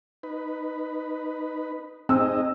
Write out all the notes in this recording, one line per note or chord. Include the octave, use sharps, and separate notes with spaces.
D#4 B4
C4 D#4 G#4 D#5 E6